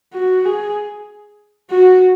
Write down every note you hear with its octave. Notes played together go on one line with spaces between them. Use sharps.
F#4
G#4
F#4